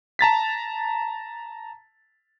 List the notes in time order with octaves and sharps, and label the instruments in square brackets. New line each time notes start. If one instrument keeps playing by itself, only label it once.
[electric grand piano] A5 A#5 A6 B6